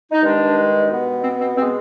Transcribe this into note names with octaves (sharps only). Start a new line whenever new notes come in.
D#4
G2 D#3 G#3 D4
B2 B3
C4
C4
B2 G#3 B3 C4